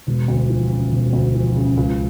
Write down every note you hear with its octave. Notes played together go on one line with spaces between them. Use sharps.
E1
D2
F3
C#3
E1
D2
F3
C#3
C#2